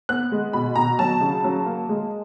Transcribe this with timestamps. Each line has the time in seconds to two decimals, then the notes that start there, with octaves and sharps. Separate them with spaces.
0.09 B3 F#6
0.32 G#3
0.53 B2 B5
0.76 B2 A#5
0.99 F#3 A5
1.21 C#3
1.44 F#3
1.66 A#3
1.89 G#3